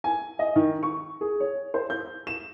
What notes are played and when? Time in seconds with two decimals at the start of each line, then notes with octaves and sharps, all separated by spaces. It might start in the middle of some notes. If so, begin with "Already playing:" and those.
0.04 G#5
0.39 D#5
0.56 D#3
0.83 C#6
1.21 G#4
1.40 C#5
1.74 C5
1.90 G6
2.27 E7